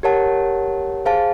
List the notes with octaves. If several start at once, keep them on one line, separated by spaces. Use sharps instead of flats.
G4 A#4 C#5 F#5 A5
G#4 C5 F5 A5